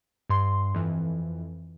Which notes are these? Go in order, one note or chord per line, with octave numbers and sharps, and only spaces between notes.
G2 C6
F2 E3